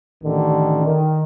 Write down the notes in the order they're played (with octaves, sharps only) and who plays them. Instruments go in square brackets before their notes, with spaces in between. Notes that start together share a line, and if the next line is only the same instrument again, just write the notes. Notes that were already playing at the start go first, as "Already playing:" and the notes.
[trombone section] A1 D3 D#3
D#3